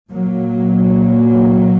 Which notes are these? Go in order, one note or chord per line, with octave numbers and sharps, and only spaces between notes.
A#2 F#3 A#3